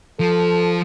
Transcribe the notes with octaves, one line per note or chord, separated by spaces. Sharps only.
F3 A4